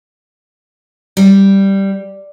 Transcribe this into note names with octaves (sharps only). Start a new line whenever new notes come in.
G3